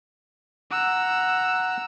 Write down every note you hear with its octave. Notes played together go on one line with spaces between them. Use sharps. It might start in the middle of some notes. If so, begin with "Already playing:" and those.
F#5 A#5 E6 F#6